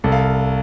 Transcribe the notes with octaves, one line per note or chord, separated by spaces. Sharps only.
C2 A4
F5